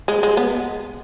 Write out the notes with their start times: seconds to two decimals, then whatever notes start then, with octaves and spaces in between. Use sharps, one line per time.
0.08 G#3
0.23 G#3
0.37 B3